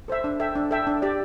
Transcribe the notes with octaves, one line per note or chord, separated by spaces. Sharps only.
A4 C5 E5
D4
A4 E5 G5
D4
A4 E5 G5
D4
G4 D5